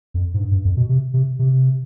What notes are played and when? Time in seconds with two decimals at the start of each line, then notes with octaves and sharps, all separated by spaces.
0.14 F2
0.34 G#2
0.39 G2
0.51 G2
0.65 F2
0.77 B2
0.89 C3
1.14 C3
1.39 C3